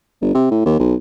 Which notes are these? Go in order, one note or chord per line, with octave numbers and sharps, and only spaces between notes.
G1
C3
A2
D#2
B1